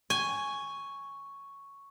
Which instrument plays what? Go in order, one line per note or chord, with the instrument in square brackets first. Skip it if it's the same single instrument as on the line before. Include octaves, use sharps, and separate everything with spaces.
[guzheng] G#5 [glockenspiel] C#6